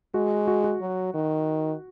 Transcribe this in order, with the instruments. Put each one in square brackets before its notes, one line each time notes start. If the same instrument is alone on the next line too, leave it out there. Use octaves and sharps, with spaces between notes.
[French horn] G#3 [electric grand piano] F#4
[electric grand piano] F#4
F#4
[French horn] F#3
D#3